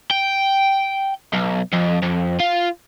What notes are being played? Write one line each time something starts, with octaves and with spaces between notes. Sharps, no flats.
G5
B1
F2
F2
F4